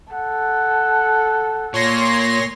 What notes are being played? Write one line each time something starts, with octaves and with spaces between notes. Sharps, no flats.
A4 F#5
A#2 C#5 C6 A#6